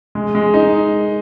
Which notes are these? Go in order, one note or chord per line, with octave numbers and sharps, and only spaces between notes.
G#3
G#3
D#4